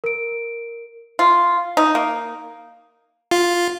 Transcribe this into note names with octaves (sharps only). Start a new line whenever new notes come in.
A#4 D7
F4
D#4
A#3
F4